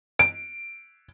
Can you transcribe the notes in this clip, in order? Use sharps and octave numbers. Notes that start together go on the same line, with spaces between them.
D7